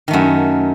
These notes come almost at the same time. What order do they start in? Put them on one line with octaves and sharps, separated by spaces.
D#3 A3 F#2